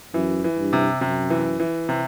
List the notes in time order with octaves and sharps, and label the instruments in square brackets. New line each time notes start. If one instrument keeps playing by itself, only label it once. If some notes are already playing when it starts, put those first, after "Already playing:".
[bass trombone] F#2 [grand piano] E3
[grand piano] E3
[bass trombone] G2
[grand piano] C3
[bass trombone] F#2 [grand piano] C3
[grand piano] E3
E3
C3